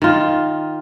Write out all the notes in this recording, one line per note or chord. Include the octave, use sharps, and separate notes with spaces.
D#3 F4